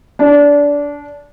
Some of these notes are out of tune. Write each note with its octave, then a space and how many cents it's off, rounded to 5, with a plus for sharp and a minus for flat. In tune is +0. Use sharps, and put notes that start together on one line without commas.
D4 -20